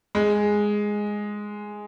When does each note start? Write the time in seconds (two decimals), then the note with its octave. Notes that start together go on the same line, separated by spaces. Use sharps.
0.15 G#3